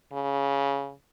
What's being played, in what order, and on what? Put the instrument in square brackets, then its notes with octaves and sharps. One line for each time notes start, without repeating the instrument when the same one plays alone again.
[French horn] C#3